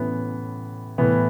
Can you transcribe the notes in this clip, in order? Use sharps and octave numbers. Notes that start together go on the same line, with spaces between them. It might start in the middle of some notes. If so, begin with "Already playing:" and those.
Already playing: A2 E3 B3 C#4
A2 E3 B3